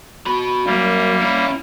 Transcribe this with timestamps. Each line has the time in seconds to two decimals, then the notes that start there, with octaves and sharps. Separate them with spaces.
0.27 F#4 B5
0.66 B1 F#2 G3 A#3
1.21 C#4 E4